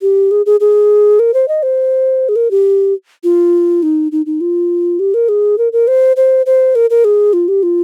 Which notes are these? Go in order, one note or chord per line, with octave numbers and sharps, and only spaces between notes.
G4
G#4
G#4
G#4
A#4
C5
D#5
C5
G#4
A#4
G4
F4
D#4
D#4
D#4
F4
G4
A#4
G#4
A#4
A#4
C5
C5
C5
A#4
A#4
G#4
F4
G4
F4